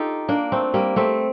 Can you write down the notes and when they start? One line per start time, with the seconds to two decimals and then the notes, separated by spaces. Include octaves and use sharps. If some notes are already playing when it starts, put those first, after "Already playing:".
Already playing: D#4 F4 G4 A4
0.29 A#3 D4
0.52 A3 C4
0.74 G3 A#3
0.96 A3 C4